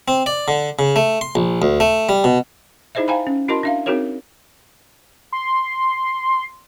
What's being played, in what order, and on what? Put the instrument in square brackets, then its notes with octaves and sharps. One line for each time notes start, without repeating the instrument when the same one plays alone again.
[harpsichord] C4
D5
D3
C#3
A3
C6
A#1
D2
A3
G3
B2
[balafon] D#4 E4 G#4 C5 D#5 E5
C5 F5 G5 G#5 A#5 B5
C#4
E4 F#4 A#4 D#5 A5 C6
D4 E5 F5
C4 D#4 F#4 G#4 A#4 C#5
[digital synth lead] C6